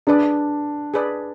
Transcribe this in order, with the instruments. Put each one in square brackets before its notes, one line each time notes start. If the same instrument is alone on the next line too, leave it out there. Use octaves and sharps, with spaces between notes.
[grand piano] D4 [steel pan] G#4 B4 D5
[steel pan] G#4 B4 D5